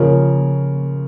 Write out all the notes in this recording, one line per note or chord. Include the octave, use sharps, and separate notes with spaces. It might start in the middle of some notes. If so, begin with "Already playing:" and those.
Already playing: C#3 F3 A#4 C#5